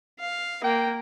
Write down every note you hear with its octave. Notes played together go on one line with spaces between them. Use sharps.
F5
A#3 G5